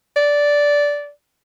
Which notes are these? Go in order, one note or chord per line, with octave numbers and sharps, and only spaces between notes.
D5